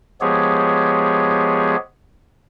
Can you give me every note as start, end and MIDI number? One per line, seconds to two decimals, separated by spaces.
0.21 1.76 53
0.21 1.76 56
0.21 1.76 59
0.21 1.76 67
0.21 1.76 68
0.21 1.76 73